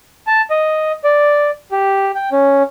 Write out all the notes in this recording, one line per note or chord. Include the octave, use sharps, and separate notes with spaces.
A5
D#5
D5
G4
G5
C#4